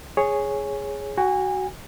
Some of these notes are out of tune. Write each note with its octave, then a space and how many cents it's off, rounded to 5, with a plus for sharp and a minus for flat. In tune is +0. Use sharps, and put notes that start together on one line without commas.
G#4 +0 C#5 +0
F#4 +15 G#5 -30